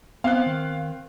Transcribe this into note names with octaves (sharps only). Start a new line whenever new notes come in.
B3 C4 F5 F#6
D#3